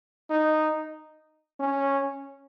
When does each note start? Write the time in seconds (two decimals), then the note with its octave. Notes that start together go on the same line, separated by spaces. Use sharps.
0.30 D#4
1.60 C#4